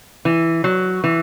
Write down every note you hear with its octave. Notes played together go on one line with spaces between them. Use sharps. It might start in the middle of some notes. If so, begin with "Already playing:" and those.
E3
F#3
E3